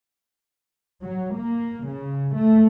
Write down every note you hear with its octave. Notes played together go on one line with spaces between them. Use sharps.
F#3
A#3
C#3
A3